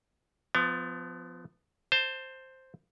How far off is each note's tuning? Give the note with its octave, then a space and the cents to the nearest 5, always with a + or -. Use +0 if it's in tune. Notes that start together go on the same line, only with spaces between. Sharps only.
F3 +0 B3 +30
C5 +0 A5 +30